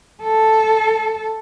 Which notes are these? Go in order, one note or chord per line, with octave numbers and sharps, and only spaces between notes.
A4